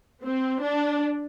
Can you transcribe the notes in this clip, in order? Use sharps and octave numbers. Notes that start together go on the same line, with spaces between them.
C4
D4